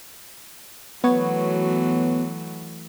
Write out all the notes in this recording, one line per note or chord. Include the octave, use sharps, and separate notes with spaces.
E3 F#3 A3 B3 F#4 C#5